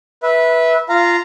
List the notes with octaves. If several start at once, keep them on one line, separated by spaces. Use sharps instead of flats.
B4 E5
F4 F5 A#5